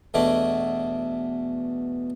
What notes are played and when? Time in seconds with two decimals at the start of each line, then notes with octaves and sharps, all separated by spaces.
0.14 E2 B2 A3 D4